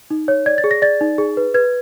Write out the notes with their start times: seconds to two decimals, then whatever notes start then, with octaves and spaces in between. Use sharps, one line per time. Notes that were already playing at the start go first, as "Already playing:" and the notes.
0.10 D#4
0.28 C#5
0.46 D5 G#6
0.58 A6
0.64 G#4
0.71 A#6
0.82 D5 A6
1.01 D#4
1.18 G#4
1.37 B4
1.54 B4 G#6